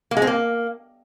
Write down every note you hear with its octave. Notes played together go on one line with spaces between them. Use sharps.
A#3
G#3
C4
A#3